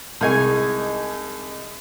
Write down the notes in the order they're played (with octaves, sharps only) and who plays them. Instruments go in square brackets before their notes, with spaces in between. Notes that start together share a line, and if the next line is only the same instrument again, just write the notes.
[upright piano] C2 G#3 [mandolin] D#4 G#5 C#6